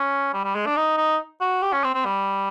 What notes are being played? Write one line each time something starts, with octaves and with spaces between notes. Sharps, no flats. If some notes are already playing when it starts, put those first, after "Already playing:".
Already playing: C#4
G3
G3
G#3
D4
D#4
D#4
F#4
G4
C#4
C4
C4
G3